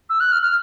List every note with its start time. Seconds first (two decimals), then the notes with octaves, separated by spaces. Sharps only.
0.10 E6
0.20 F#6
0.32 F6
0.43 F6